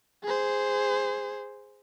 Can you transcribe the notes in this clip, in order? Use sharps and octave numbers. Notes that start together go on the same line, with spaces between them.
G#4 C5